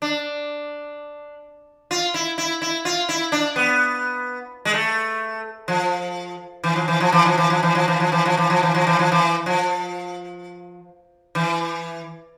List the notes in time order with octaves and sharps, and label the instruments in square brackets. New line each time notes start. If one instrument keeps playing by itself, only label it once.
[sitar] D4
F4
E4
E4
E4
F4
E4
D4
B3
G#3
A3
F3
E3
F3
E3
F3
E3
F3
E3
F3
E3
F3
E3
F3
E3
F3
E3
F3
E3
F3
E3
F3
E3
F3
E3